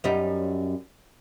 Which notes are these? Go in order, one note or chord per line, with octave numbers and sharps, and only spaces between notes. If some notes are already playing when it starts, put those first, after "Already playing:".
F#2 G3 D#4